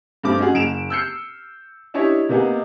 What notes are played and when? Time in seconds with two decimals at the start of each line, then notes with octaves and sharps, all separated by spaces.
0.23 G2 A3 C4 D6
0.39 C#4 D#4 F#4 G#4
0.54 F#1 D7 E7 F7
0.90 E6 F6 G6 C7 C#7
1.94 D4 E4 G4 C#5 D#5
2.29 C3 A#3 B3 D#4 G#4